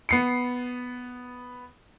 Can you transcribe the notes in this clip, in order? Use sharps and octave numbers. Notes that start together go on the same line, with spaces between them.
B3 C7 C#7